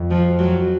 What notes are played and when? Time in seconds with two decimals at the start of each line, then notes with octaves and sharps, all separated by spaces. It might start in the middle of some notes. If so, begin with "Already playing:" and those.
Already playing: F2
0.11 F3
0.39 F#3